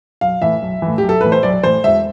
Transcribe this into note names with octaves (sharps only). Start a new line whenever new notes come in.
B1 F5
A2 E3 E5
B1
A2 E3
B1 G4
A4
A2 E3 B4
C5
B1 D5
A2 E3 C5
E1 E5